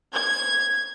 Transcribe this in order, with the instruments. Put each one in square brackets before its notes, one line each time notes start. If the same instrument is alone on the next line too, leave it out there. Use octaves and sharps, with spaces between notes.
[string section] G#6